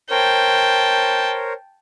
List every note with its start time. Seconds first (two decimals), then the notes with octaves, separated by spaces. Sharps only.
0.11 A#4 C5 C#5 G5 A5